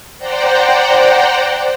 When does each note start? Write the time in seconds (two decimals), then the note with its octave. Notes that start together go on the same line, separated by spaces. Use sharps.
0.19 C5 D5 F#5 G5 A#5